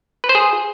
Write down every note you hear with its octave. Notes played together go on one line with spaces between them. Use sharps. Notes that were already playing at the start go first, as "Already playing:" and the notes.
B4
C5
G#4